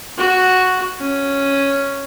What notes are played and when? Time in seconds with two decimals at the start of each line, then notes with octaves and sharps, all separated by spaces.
0.18 F#4
1.00 C#4